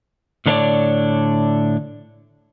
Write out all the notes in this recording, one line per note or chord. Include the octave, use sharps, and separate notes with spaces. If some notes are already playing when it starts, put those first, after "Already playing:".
A2 D3 D4 B4 C#5 D5